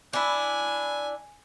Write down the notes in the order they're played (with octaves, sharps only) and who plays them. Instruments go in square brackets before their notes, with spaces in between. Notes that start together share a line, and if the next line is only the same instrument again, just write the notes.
[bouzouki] D4 E4 [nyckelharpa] G#5